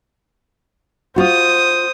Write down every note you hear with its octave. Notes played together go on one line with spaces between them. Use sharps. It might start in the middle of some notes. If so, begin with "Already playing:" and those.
F4 F#4 C5 D#6